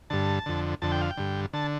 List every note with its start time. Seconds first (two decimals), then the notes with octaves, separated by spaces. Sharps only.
0.10 G2 D3 A5
0.46 F2 D3
0.82 F2 D3 A5
0.92 G5
1.01 F5
1.11 G5
1.17 G2 D3
1.53 D3 A5